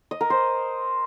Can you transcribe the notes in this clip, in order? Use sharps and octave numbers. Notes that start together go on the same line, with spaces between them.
D#5
A#4
C5